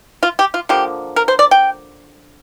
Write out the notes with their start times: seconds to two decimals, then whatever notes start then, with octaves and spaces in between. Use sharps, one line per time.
0.23 F4
0.39 G4
0.54 F4
0.69 D3 F3 A#3 G4
1.16 A#4
1.28 C5
1.39 D5
1.51 G5